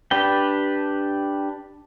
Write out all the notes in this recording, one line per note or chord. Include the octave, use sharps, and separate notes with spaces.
D4 G4 B4 G5